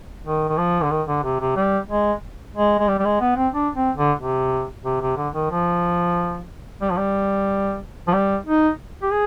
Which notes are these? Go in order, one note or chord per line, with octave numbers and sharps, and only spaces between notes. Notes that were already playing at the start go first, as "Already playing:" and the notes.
D#3
D#3
F3
D3
D#3
D3
C3
C3
G3
G#3
G#3
G#3
G3
G3
G#3
B3
C4
D4
C4
D3
C3
C3
C3
D3
D#3
F3
G3
F3
G3
F3
G3
D#4
G4
G#4